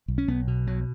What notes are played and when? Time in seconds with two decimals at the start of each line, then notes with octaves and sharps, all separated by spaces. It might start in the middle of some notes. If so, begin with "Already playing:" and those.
0.08 B1
0.18 C#4
0.28 B1 B3
0.47 B2
0.67 B1 F#3